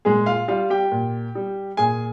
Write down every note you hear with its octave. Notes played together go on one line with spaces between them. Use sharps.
A#2 G#3 G#4
F4 F5
G3 F4 F5
G4 G5
A#2
G3
A#2 G#4 G#5